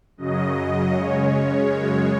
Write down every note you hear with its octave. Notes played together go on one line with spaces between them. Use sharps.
F#2 C#3 F#3 D#5
C#3 G#3 C#4 C#5
F#2 C#3 G#3